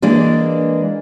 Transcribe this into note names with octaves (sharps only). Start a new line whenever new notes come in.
E3 G#3 A#3 D4